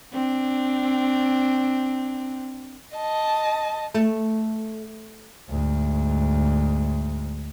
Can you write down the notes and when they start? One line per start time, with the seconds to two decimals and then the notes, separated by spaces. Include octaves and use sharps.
0.12 C4 D4
2.96 D#5 A5
3.94 A3
5.49 D2 G#2